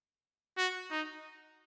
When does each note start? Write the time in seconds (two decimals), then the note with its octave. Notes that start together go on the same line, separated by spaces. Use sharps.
0.57 F#4
0.91 D#4